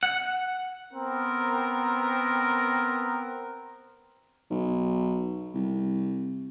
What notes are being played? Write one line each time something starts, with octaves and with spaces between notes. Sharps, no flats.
F#5
B3 C4 A#4
B1
C2